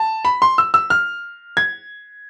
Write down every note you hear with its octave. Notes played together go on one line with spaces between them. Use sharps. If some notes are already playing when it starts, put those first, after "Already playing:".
Already playing: A5
B5
C6
E6
E6
F6
G#6